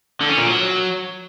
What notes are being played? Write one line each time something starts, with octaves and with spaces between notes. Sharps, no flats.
D3
C#4
A#2
F#3